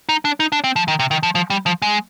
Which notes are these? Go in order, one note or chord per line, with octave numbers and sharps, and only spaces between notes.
D#4
D4
D#4
D4
C4
F3
D#3
C3
D#3
F3
F3
G3
F3
G#3